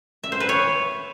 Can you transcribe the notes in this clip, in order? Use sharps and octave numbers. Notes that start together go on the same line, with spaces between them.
E5
C5
B4
C#5